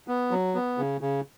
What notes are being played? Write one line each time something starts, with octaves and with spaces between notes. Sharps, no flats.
B3
F#3
B3
C#3
C#3